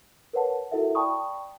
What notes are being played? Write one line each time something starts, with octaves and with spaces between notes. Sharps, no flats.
A#4 B4 C#5 F#5 A5
E4 F#4 A4 A#4 E5 F#5
D5 G5 A5 B5 C#6 D#6